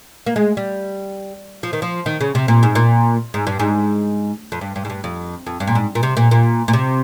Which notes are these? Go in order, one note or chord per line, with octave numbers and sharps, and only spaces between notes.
A#3
G#3
G3
F3
D#3
F3
D#3
C#3
C3
A#2
G#2
A#2
G#2
G2
G#2
F2
G2
G2
G#2
G2
F2
F2
G2
A#2
G#2
A#2
C3
A#2
A#2
A#2
C3